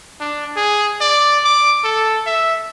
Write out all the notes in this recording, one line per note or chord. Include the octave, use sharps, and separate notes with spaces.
D4
G#4
D5
D6
A4
E5